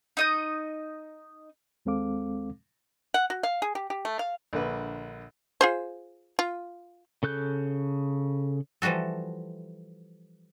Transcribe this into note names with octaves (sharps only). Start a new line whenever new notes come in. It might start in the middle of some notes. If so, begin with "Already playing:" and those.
D#4 D#5 G6
D#2 G#3 C4 A4 F5 D6
F#5
F#4
F5
G#4
G4
G4
A3
F5
A#1 D3 B4
F4 G#4 C5
F4
C#3 A4 F#6 G6
E3 F3 G3 F#4 A4